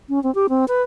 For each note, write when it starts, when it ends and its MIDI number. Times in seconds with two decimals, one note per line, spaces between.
0.09 0.21 61
0.23 0.33 60
0.35 0.47 67
0.49 0.65 60
0.68 0.82 71